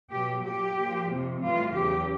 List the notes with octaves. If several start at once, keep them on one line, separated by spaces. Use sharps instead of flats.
B2 F#3 G4
A#2 F#3 G4
A#2 F3
F2 C3 F3
A2 E3 G3 F4
E2 C#3 F#3 G4